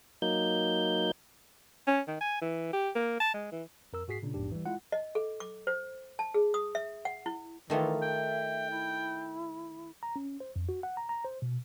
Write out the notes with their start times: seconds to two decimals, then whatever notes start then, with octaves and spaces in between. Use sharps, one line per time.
0.22 F#3 A#3 D#4 G6
1.87 C#4
2.08 D#3
2.21 G#5
2.42 E3
2.73 G4
2.95 A#3
3.20 A5
3.34 G#3
3.52 E3
3.93 F2 A#4 E6
4.08 G#2 F#4 G#4 B6 C7
4.23 A#2 C#3 D4
4.34 A#1 E2 G#2 D4 G4
4.52 E3 G3
4.66 G#3 E4 F4 F#5
4.92 D#5
5.15 A4
5.40 D6
5.67 C5
6.19 A5
6.34 G#4
6.54 D#6
6.75 E5
7.05 F#5
7.26 E4
7.70 D#3 E3 A3 F4 E5
8.02 G5
8.70 E4
10.03 A#5
10.16 C#4
10.40 C5
10.56 F2
10.69 F#4
10.83 F#5
10.97 A#5
11.09 A#5
11.24 C5
11.42 B2